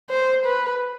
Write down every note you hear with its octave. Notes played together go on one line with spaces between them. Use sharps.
C5
B4